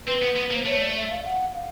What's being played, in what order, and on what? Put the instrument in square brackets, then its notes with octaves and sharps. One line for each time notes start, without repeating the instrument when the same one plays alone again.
[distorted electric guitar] C4 [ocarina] B4
[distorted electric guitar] B3
B3
A#3
[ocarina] C5
[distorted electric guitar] A3 [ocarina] C#5
[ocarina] D5
E5
F5
F#5
F5